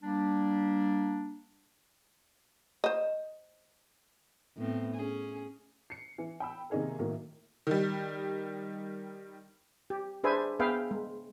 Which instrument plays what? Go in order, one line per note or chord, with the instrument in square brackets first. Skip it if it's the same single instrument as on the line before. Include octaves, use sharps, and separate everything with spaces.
[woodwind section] G3 A#3 D4
[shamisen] C5 D#5
[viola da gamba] A2 B3 C4
C#4 G#4
[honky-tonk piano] C7 C#7
E3
G5 B5 E6
C3 D#3 A#3 D#4 G#4 A#4
A2 D#3 F#3 A#3
D#3 G3
[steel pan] G4
D4 G#4 B4 C5 E5 G#5
B3 G#4 B4 E5 F5 G5
G#3